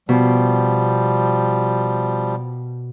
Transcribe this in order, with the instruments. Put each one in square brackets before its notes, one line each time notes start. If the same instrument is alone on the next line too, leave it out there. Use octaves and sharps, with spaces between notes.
[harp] B2 [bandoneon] F3 G3